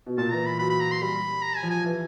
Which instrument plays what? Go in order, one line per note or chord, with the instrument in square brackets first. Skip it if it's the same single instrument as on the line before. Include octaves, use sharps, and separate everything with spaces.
[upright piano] B2
[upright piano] A#2 [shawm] A5
[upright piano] E3 [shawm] A#5
[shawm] B5
[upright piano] F#3 [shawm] B5
[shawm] B5
A#5
C6
[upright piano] G3 [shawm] B5
[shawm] A#5
G#5
[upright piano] F3
[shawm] G#5
[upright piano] E3